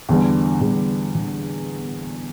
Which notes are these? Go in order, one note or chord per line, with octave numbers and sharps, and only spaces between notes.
E2 D3 G3
E2 D3 G3
D3 G3